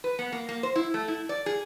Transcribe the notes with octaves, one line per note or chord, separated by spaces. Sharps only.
B4
B3
A#3
A#3
C5
E4
A3
E4
D5
G#4